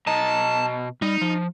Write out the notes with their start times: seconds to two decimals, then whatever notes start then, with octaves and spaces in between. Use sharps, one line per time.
0.07 B2 D#5 A5 A#5
1.02 G3 D#4
1.21 F3